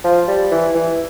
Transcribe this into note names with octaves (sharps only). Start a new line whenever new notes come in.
F3
G3
E3
E3